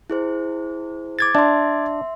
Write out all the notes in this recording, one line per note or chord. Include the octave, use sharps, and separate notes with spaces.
E4 G#4 C5
D6 G#6 A6
D4 E5 C6